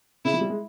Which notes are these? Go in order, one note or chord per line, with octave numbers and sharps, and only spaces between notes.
C#3 E4
F3
G3
G#3